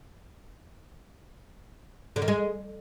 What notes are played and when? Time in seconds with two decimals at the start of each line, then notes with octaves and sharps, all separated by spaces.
2.16 D3
2.22 D#3
2.28 G#3